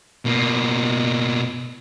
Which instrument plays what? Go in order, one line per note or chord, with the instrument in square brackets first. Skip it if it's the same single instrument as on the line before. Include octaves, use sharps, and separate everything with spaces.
[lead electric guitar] B2 A#3